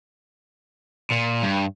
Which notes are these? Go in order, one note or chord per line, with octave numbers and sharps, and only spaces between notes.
A#2
G2